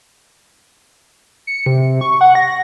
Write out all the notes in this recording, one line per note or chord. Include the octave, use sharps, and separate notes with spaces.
C#7
C3
C#6
F#5
A#6